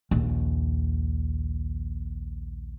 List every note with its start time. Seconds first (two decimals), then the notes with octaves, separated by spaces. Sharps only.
0.11 A#1 D#2